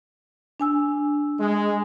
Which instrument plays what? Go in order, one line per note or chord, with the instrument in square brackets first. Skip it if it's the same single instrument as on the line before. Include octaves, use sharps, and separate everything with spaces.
[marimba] D4 G#5 E6
[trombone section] G#3